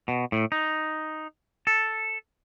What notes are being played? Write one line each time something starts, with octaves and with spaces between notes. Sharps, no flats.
B2
A2
D#4
A4